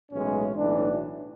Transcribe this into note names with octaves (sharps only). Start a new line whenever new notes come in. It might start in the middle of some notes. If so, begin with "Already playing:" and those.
B1 A2 E3 G#3 C#4
B1 A2 E3 D4